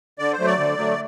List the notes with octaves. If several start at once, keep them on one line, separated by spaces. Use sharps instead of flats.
D3 D5
C5
F#3 A3
D5
D3
F#3 A3